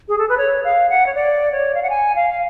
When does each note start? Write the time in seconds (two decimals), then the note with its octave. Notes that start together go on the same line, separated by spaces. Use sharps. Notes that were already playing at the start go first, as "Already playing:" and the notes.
0.08 G#4
0.18 A4
0.28 B4
0.37 C#5
0.64 F5
0.89 F#5
1.06 C#5
1.14 D5
1.52 C#5
1.74 F5
1.82 F#5
1.89 G#5
2.15 F5
2.29 F5